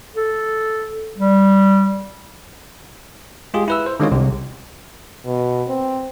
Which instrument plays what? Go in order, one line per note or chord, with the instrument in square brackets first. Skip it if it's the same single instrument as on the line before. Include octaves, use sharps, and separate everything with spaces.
[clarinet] A4
G3
[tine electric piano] G#3 F4 G4 G#4
E4 B4 E6
C5
D3 D#3 G#3 C#4 F4 C#5
C2 C3
[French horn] B2
C4